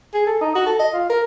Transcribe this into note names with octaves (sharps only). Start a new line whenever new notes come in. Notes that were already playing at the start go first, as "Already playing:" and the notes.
G#4
A4
D#4
F#4
A4
D#5
F4
A#4